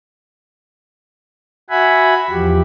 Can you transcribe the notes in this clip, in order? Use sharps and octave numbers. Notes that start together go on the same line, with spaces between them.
F#4 E5 F#5 G#5 B5
E2 F3 G4